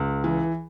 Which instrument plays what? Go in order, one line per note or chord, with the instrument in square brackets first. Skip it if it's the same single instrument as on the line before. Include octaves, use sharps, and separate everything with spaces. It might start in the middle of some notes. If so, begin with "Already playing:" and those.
Already playing: [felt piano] C#2
E3